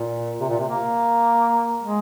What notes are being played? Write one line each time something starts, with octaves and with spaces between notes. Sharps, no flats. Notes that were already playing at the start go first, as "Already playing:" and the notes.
Already playing: A#2
C3
A#2
C3
A#3
G#3